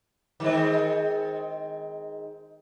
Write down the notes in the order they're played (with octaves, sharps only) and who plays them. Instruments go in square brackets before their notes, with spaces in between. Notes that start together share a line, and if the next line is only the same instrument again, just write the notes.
[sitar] D#3 G#3 C4